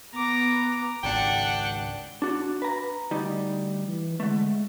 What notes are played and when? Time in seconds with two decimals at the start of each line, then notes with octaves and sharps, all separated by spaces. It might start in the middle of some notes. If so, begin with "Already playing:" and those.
0.14 B3 A#5 D6
1.03 G#1 C#2 D4 F#5 G5
2.22 D4 F#4
2.62 B4 A#5
3.11 D2 G3 D#4
3.88 E3
4.20 D3 G#3 A3